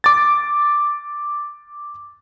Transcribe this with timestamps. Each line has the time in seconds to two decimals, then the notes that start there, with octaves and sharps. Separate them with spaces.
0.04 D6 A6